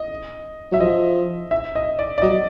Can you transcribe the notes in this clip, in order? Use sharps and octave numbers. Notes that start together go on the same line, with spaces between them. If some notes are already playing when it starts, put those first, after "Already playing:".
Already playing: D#5
F#3 E5
F3 D#5
E5
D#5
D5
D5
F#3 D#5